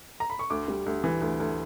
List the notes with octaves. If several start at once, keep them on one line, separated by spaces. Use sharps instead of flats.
A#5
B5
C#6
D2 D6
G3
D2
E3
D2
D2